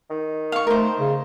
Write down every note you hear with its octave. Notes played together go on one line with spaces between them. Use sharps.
D#3
F5 C#6
A3 A#4 C5
C#3